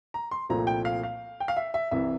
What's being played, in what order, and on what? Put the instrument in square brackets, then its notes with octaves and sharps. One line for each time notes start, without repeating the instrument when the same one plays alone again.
[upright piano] A#5
C6
[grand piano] C2 A#2 F3 A3 C4 [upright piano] A#5
[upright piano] G5
F5
F5
G5
F5
E5
E5
[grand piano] C2 C3 E3 [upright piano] E5